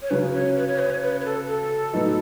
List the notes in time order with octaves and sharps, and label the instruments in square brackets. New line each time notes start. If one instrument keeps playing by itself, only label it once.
[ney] C#5
[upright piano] C#3 F#3 C#4 [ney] B4
[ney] C#5
B4
C#5
B4
C#5
B4
B4
A4
A4
[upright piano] A2 F#3 B3 D#4